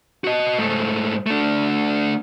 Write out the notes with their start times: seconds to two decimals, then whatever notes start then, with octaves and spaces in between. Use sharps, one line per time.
0.24 F#4 D#5
0.58 G#2 A3
1.26 A3 D4